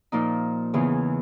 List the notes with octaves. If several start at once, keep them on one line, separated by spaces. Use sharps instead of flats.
A#2 F3 A#3 D#4
E2 C#3 E3